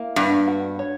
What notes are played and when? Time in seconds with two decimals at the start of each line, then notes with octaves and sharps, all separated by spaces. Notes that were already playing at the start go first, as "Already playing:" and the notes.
Already playing: A#3 E4
0.16 G2 B3
0.48 F#4
0.79 C#5